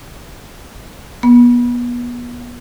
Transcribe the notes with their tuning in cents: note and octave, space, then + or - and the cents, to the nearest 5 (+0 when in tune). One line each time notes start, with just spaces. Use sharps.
B3 -30